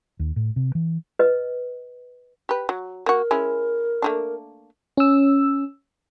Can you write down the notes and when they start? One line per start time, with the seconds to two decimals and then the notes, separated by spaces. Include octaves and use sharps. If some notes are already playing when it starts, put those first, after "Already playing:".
0.20 D#2
0.36 A2
0.56 C3
0.75 E3
1.19 B4 D#5
2.49 G4 B4
2.69 F#3
3.06 A#3 F#4 A#4
3.31 G#3 C#4 E4
4.02 A3 A#3 D4
4.97 C#4 E6